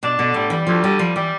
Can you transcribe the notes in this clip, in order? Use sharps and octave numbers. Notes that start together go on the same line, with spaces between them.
B2 D4
B2 D3
A2 G3
E3 G3
D2 F3
D3 G3
F3 G3
E3 G3